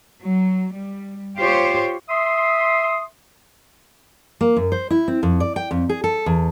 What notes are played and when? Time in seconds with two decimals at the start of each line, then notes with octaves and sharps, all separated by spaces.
0.23 F#3
0.73 G3
1.37 F4 G4 C5 C#5
2.10 E5 C6 D#6
4.41 A#3
4.56 F#2
4.72 C5
4.90 E4
5.08 C4
5.23 F2
5.40 D5
5.56 G5
5.71 F2
5.89 G#4
6.04 A4
6.26 E2